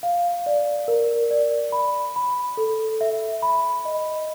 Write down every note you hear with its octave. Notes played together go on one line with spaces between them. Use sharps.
F5
D5
A#4
D5
B5
B5
A4
E5
B5
D#5